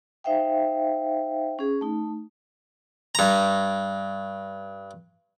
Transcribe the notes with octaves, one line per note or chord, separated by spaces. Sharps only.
D#4 C5 E5 F5 G5
C#4 G#4
A3 D#4
G2 A#5